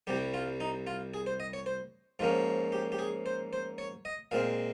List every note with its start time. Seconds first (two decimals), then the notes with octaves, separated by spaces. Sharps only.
0.07 C2 C3 G3 G4
0.34 F4
0.60 D#4
0.87 F4
1.14 G#4
1.27 C5
1.40 D#5
1.53 C#5
1.66 C5
2.19 G#2 F3 A#3 C#4 F4
2.72 G4
2.92 G4
2.99 G#4
3.26 C5
3.53 C5
3.78 C#5
4.05 D#5
4.31 A#2 G#3 C4 F5